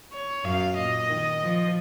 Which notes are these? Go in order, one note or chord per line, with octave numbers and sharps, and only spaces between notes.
C#5
F#2 F5
A#2 D#5
D#3
F3